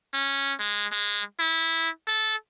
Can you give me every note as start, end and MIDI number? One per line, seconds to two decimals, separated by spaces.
0.13 0.52 61
0.59 0.85 56
0.92 1.21 56
1.39 1.89 64
2.08 2.34 69